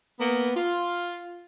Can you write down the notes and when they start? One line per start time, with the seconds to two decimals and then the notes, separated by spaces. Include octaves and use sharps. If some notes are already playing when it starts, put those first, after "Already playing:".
0.20 A#3 B3
0.56 F4